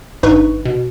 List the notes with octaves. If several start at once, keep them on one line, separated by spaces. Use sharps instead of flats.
G#1 G2 D#4 B4 C#6
B2